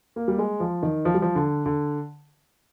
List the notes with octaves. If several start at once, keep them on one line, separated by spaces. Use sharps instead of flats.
A#3
G3
G#3
F3
D#3
F3
G3
F3
D3
D3